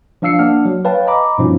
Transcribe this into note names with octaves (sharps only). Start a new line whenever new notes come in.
F3 D4 F5 E6 C7 C#7
A#3 D4 F#5 F6
F#3
B4 C#5 F5 G5 A5
D#5 A#5 B5 D6
G2 B2 F3 B3 C#4 D#4